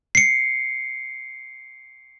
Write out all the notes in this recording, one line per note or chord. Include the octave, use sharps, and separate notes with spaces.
C7 C#7